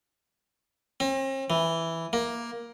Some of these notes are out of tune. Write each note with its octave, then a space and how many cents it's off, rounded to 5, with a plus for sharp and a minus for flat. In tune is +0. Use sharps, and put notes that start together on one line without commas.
C4 +45
E3 +0
A#3 +10